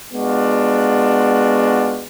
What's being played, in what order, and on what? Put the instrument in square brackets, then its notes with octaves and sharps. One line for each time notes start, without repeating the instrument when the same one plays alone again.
[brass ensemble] G#3 B3 D4 F4 F#4